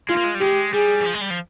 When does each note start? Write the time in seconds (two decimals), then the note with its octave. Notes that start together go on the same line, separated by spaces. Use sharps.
0.09 G#3 F4
0.17 A#3
0.24 G#3
0.35 G3
0.40 G#3 G4
0.73 G3 G#4
1.01 E3
1.06 F3
1.14 G#3
1.21 G3
1.30 F3